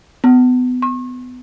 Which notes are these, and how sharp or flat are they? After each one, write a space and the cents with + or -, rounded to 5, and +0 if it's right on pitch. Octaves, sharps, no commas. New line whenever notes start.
B3 +25
C#6 -40